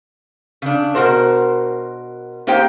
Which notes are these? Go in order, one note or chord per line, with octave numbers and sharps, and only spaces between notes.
C#3 D4
B2 F#4 A#4 C5
A#3 D#4 G4 C5 G5